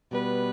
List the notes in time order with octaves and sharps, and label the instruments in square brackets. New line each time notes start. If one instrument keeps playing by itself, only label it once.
[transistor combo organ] B2 G3 B3 [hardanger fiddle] B4